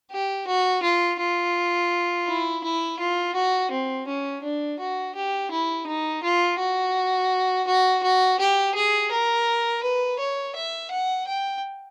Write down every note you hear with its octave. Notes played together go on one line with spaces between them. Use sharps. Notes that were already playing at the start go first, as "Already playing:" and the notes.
G4
F#4
F4
F4
E4
E4
F4
F#4
C4
C#4
D4
F#4
G4
E4
D#4
F4
F#4
F#4
F#4
G4
G#4
A#4
B4
C#5
E5
F#5
G5